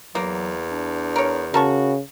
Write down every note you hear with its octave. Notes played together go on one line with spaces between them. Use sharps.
E2 F#3 A#3
D4
A#4 C#5
C#3 F#4 A#4 A5 C#6